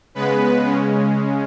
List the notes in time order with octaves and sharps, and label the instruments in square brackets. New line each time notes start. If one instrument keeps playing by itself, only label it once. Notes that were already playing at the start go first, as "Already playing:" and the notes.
[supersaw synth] C#3 G#3 B3 B4
C#3 G#3 C#4